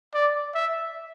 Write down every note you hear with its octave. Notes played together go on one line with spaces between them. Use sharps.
D5
E5